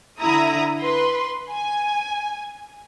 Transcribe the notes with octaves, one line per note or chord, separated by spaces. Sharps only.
D3 E4 A#5 D#6
B4 C6
G#5